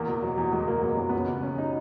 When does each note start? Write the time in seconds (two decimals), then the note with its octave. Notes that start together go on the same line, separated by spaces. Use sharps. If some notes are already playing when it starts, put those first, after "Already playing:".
Already playing: E2 A#3
0.08 B2
0.23 F#3
0.38 E2
0.52 E2 G#3
0.68 B2 A#3
0.83 F#3 B3
0.96 E2 C#4
1.09 C#2 B3
1.28 C#3
1.42 F#3 C#4
1.58 D#4